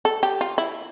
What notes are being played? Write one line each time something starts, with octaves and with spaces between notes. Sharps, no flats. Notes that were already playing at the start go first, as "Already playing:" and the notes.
A4
G4
F4
E4